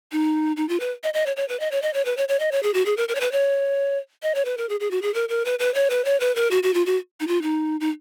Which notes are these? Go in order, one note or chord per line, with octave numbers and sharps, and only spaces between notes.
D#4
D#4
F4
B4
D#5
D#5
C#5
C#5
B4
D#5
C#5
D#5
C#5
B4
C#5
C#5
D#5
C#5
G#4
F#4
G#4
A#4
A#4
C#5
B4
C#5
D#5
C#5
B4
A#4
G#4
G#4
F#4
G#4
A#4
A#4
B4
B4
C#5
B4
C#5
B4
A#4
F#4
F#4
F4
F#4
D#4
F4
D#4
D#4